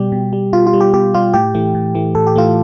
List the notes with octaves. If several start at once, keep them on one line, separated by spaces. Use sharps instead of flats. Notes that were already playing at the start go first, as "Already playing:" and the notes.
Already playing: B2 G3 G4
B2
G3
B2 F4
F4
G3
G4
B2 G4
G3 F4
A2 G4
E3 A3
A2
E3 A3
A2 A4
G4
E3 A3 F4